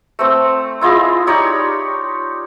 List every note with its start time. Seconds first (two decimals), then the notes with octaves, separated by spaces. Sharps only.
0.19 A3 C4
0.81 E4 F4 G#4 D#5
1.27 D#4 G4 C#5 D5